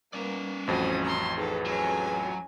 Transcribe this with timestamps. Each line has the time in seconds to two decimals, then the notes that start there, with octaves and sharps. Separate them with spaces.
0.13 G3 A#3 B3 C#4 D5
0.67 A1 F2 F#4 C5 D#6
1.05 A#5 C6
1.37 D#4 G#4 A4 B4
1.66 F#3 C#4 G#5